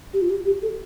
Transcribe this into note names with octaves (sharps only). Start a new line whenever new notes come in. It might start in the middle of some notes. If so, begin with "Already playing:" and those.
G4
F4
G4
G4
A4